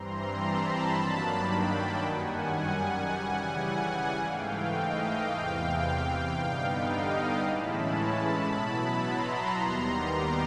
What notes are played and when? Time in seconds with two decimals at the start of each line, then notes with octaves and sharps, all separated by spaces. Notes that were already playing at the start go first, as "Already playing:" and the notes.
Already playing: G2 E3 G3 C4 A#5 C6
0.39 A5 B5
0.92 G2 D#3 F#3 A#3 D4
1.47 G5 A5
2.00 F#2 D#3 G3 F#5 G#5
3.08 C#3 E3 G3
3.62 F#5 G#5
4.16 G#2 E3 A3 F5 G5
4.69 D#5 F5
5.23 E2 C3 E3 F5 G5
6.32 G2 D3 G3 B3 D#4
6.85 D#5 F5
7.38 A2 E3 G#3 C#4 E4 A5 B5
7.92 A5 B5
8.46 B2 F#3 B3 E4 A5 B5
9.00 A#5 C6
9.54 D#2 D#3 G3 B3
10.07 C6 D6